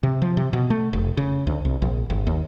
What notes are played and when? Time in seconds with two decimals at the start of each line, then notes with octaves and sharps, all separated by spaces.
0.03 C3
0.22 F3
0.37 C3
0.53 B2
0.70 A3
0.93 F1
1.17 C#3
1.47 D2
1.65 C2
1.82 A#1
2.10 G1
2.27 D#2